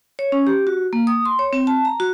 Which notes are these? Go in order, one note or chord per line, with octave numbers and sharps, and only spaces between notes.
C#5
C#4
G4
F#4
A#3
D#6
C6
C#5
C4
A5
A#5
F#4